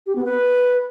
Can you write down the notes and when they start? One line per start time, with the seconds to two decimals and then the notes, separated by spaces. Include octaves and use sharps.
0.06 G4
0.15 B3
0.25 B4